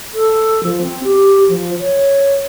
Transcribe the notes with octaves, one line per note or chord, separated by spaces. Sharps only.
A4
F3
C4
G4
F3
C#5